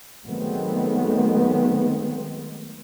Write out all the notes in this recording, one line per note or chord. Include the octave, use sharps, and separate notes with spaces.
D#3 F#3 G#3 A3 B3 C4